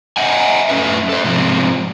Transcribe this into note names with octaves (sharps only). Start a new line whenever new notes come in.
D#5 E5 F#5 G#5
F#2 A3 C#4 B4 E5
A4 C5
G#2 C3 F3 C4